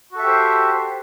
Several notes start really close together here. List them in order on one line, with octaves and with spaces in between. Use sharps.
F#4 A4 E5 G4 C5